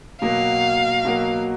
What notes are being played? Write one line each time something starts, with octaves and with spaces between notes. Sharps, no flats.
B2 F#3 A#3 F5
B2 F#3 A#3